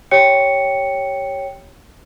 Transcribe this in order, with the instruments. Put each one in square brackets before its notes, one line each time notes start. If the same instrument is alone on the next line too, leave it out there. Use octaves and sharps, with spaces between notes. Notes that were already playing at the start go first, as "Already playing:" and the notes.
[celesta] G4 C#5 G5 C#7